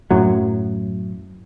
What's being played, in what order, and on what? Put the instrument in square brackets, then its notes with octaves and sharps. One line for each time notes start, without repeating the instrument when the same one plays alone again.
[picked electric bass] F#2 A2 F#3